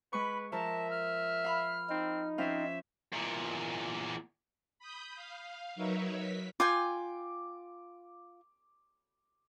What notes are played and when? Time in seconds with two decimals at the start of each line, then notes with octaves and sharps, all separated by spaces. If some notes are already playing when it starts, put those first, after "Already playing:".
0.13 G#3 B4 B5 C#6
0.52 F3 A#4 E5 A5
0.90 F6
1.44 F5 B5
1.90 C4 D#4
2.38 F3 C4 C#4 E5 F5
3.12 E2 A#2
4.79 B5 D#6 G6
5.15 F5
5.75 F#3 D#4 A#4 B4 C#5 E5
6.17 B6
6.60 F4 G5 G#5 D6